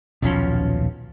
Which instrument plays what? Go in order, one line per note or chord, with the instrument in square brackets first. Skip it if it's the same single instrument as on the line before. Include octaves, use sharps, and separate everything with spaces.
[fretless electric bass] D#1 B1 F3 C#4